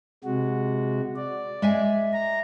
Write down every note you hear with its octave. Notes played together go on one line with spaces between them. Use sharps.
C3 G#3 F#4
D5
G#3 E5 G#5
A#5